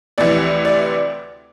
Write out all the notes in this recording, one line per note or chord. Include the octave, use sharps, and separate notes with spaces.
D2 C3 E3 D5
D5